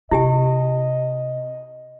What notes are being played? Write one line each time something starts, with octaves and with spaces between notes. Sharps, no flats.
C3 E4 G4 D#5 G#5